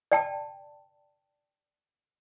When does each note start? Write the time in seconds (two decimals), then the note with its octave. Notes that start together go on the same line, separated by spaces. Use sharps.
0.12 D5 G5 A5